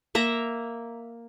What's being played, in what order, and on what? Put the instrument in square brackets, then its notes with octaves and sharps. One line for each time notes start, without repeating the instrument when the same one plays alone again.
[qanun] A#3 E5 A#5